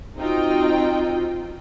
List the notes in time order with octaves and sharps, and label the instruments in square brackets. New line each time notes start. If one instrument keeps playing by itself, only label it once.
[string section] C4 D#4 F4 F#4 D#5 G5